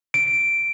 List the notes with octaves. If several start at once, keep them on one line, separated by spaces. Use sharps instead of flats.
D7